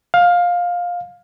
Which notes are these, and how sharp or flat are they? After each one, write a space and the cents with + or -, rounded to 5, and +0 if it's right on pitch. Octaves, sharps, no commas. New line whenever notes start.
F5 +15